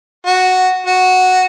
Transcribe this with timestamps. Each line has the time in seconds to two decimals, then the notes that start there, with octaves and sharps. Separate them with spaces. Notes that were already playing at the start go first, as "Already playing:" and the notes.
0.26 F#4
0.87 F#4